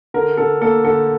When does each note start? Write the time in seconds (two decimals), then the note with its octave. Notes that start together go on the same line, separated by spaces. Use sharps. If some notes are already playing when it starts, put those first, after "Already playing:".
0.14 D3 A#4
0.37 D3 A4
0.61 A#3 A4
0.84 D3 A4